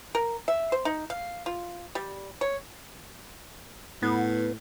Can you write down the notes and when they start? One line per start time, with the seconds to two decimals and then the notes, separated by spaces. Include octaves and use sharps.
0.15 A#4
0.48 E5
0.72 C5
0.85 D#4
1.10 F5
1.46 F4
1.95 G3
2.41 C#5
4.02 A2 B3